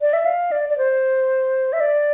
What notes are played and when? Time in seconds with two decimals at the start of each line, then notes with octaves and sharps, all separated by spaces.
0.01 D5
0.13 E5
0.25 F5
0.52 D5
0.69 D5
0.78 C5
1.73 E5
1.80 D5